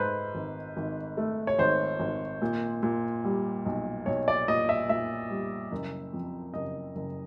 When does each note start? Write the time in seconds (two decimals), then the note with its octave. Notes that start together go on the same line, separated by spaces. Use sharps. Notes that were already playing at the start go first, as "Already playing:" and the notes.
Already playing: G#2 A3 B4 C5
0.35 G#1
0.77 G#1
1.17 A3
1.47 C#5
1.59 G#1 C5
2.00 G#1
2.42 A#2
2.83 A#2
3.25 G3
3.66 B1
4.06 B1 C#5
4.28 D5
4.48 A#2 D#5
4.69 E5
4.89 A#2 E5
5.30 G3
5.72 F#1
6.13 F2
6.54 F#1 D#5
6.96 F#1